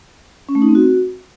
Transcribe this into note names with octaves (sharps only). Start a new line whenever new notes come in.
C#4
A3
D#4
C4
F#4